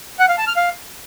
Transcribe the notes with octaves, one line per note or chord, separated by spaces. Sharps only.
F#5
F5
A5
F6
F5